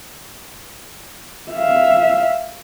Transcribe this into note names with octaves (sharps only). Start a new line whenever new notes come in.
E5 F5